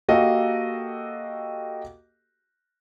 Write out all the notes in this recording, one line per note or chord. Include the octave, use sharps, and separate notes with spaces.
A#3 F#4 G4 A4 D#5 F5